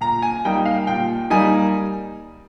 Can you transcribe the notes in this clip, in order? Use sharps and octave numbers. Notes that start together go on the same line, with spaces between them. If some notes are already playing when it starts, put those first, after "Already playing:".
A#2 A#5
G#5
G3 A#3 D#4 G5
F5
A#2 G5
G3 A#3 D#4 G#5